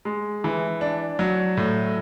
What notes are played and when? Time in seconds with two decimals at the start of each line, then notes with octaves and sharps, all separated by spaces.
0.05 G#3
0.44 E3
0.81 D4
1.19 F#3
1.57 A2